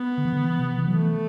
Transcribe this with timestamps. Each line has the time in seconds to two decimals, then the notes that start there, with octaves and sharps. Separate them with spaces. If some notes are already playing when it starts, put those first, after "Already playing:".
Already playing: B3
0.18 D3
0.25 E3
0.33 D3
0.43 E3
0.59 C3
0.77 E3
0.87 F#3
0.93 E3 A3